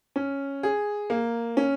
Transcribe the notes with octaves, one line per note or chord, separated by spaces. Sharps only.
C#4
G#4
A#3
C#4